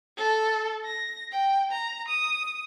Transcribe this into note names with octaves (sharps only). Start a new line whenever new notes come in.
A4
A#6
G5
A#5
D#6